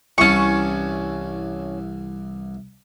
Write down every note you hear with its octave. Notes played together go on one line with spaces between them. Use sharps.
C2 E3 C#4 A5 C#6